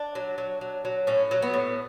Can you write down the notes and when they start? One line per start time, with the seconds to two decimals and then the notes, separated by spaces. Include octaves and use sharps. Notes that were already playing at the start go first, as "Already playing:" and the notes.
Already playing: D4
0.15 F#3
0.38 F#3
0.61 F#3
0.85 F#3
1.07 A2 C#4
1.31 F#3
1.42 B3
1.54 A2